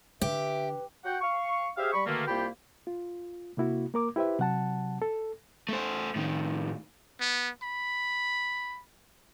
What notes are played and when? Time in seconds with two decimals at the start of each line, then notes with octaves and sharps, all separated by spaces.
0.22 D3 G4 B4 E5
1.05 F#4 F#5 G5
1.21 F5 C#6
1.77 G4 G#4 C5 E5 F5
1.93 G3 B5 C#6
2.06 B2 D3 D#3 A3 A#3
2.27 C2 A#3 F4 G4 G5 B5
2.87 F4
3.57 C3 A#3 E4 F#4
3.94 A#3 A#4 D6
4.16 E4 G4 B4 C5 E5
4.39 C3 F#3 F#5 A5
5.02 A4
5.69 A3 C5
6.16 A2 D#3
7.21 B3
7.63 B5